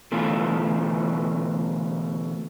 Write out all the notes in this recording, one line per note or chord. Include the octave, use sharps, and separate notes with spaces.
B2 D3 E3 A3 F4